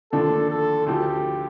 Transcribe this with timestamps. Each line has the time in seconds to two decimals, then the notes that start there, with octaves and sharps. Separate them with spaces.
0.12 D#2 D3 F3 A3 D4 A4
0.50 A4
0.86 D2 D3 F3 G4